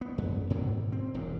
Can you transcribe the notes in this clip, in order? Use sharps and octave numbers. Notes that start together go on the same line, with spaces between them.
B3
F#2
G#2 B2 D3 D#3
C4
E1 E2 G2